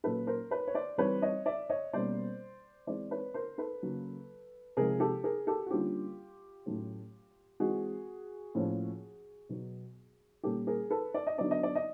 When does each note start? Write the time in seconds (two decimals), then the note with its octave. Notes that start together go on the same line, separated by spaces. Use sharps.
0.04 A#2 F#3 A#3 C#4 A4 B4
0.27 A#4 C5
0.51 B4 C#5
0.67 C#5
0.74 C5 D5
0.98 E3 G3 C4 B4 C#5
1.22 C#5 D#5
1.46 D5 E5
1.70 C#5 D#5
1.93 B2 G3 A#3 C#4 C5 D5
2.87 E3 G#3 C4 C5 D5
3.11 B4 C#5
3.34 A#4 C5
3.58 A4 B4
3.82 C#3 F#3 A#3
4.77 C3 F3 G#3 G#4 A#4
5.00 G4 A4
5.24 G#4 A#4
5.47 G4 A4
5.66 F#4
5.71 D3 G3 A#3 C#4 F4 G4
6.66 A2 F#3 A3 C#4
7.60 E3 G#3 C4 F#4 G#4
8.55 A2 F3 A#3 C#4
9.49 B2 F#3 B3
10.43 A#2 G3 A#3 C#4 G4 A4
10.67 G#4 A#4
10.91 A4 B4
11.14 D5
11.27 D#5
11.38 D3 F#3 B3 D5
11.51 D#5
11.63 D5
11.75 D#5